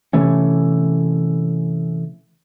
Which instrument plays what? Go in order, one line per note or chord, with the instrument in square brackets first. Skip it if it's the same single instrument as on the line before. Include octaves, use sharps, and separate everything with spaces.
[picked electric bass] C3 E3 A3 C#4